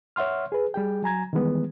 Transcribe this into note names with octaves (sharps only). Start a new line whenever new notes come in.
C#5 E5 F#5 C6 F6
G#4 B4
G3 G#4 G5
F#3 G#5 A#5 G#6
D#3 E3 G3 G#3 B3